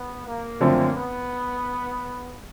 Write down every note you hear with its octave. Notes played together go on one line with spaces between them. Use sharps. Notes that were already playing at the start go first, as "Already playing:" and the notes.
Already playing: B3
A#3
F#2 D3 F3 A3 C4
B3